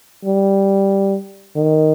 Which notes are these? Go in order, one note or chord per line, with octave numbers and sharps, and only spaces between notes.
G3
D#3